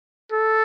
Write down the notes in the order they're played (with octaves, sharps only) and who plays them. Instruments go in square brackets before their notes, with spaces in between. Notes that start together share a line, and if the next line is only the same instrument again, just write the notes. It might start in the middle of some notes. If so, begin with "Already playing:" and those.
[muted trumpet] A4